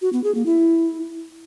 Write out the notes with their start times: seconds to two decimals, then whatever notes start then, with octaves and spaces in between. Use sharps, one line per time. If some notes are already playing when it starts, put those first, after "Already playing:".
0.02 F#4
0.13 B3
0.24 G#4
0.35 A#3
0.46 E4